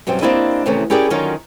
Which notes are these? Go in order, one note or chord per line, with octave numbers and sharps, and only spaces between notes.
F#2 B2 F#3 G3 C4
A#3 C4 D4 E4 G4 D#5
C3 D#3 E3 A3 B3 C#4
C#4 E4 G4 G#4 A#4 D5
D3 D#3 F#3 C#4 D#4 F4